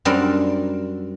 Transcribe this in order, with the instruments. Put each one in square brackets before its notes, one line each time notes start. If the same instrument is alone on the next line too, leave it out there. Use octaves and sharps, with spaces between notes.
[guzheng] F#2 G3 C4 D4 A#4